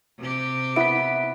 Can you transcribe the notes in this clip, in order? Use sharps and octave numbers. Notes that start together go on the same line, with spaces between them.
C3 G4
B3 E4 E5 B6 D7